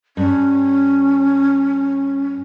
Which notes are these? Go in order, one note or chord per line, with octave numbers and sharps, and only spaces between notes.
G2 C#4